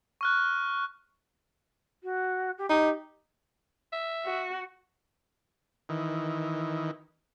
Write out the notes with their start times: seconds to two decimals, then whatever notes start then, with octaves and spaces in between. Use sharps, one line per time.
0.21 C#6 F6 F#6
2.03 F#4
2.58 G4
2.70 D#4 G4
3.92 E5
4.25 F#4
5.89 D#3 E3